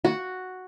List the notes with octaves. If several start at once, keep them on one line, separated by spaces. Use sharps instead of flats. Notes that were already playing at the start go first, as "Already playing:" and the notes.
F#4